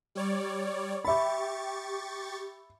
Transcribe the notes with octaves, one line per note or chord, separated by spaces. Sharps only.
G3 C#5 D5
G4 E5 B5 C#6 A6